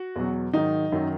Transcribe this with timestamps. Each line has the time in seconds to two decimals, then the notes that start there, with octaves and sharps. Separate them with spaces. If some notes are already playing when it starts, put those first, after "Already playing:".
Already playing: F#4
0.16 E2 B2 F#3
0.53 G#2 D#3 F#3 D#4
0.92 F#2 D#3 F#3